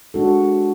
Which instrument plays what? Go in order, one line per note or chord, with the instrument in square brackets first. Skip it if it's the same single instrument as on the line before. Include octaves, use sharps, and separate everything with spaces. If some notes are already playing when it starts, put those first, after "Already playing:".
[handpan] G#3 D4 F#4 A4